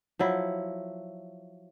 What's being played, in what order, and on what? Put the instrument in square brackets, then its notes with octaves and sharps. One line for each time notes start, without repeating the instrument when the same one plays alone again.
[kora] F3 F#3 E4